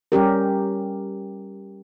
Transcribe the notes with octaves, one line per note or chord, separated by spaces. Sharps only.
G3 C#4 G4 A#4